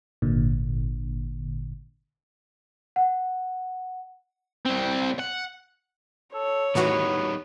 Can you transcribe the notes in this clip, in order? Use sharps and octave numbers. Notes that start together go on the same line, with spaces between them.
G#1 A#2 D3
F#5
C2 C4
F#5
A4 C#5
A2 D#3 E3 G3 B3 D#4 F#4